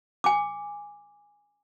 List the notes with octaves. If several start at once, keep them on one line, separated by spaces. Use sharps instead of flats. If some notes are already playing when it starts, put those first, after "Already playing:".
G#5 D6